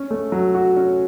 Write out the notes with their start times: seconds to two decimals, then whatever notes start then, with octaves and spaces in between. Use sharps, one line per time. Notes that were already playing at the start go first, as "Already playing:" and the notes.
Already playing: C#4
0.11 A3
0.32 F#3
0.55 F#4
0.77 C#4